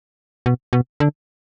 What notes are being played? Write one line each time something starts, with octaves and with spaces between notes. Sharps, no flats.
B2
B2
D3